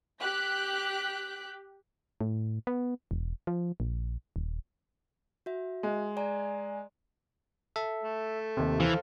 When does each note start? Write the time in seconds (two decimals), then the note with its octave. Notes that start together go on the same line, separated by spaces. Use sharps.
0.21 G4 F#6 G6 B6
2.21 A2
2.67 B3
3.11 E1
3.47 F3
3.80 A#1
4.36 D#1
5.46 F#4 E5
5.83 G#3
6.17 D5 G#5 A#5
7.76 A4 E5
8.03 A3
8.57 D#2 C3
8.80 E3 A4 C5 F5